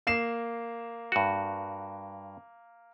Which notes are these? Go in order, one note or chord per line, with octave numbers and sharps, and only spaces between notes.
A#3 C7 E7
G2 F#4